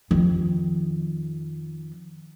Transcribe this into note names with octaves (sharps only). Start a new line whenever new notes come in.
F2 D#3